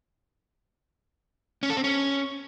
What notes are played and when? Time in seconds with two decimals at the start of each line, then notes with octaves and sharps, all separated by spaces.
1.63 C#4
1.70 A4
1.77 C4
1.84 C#4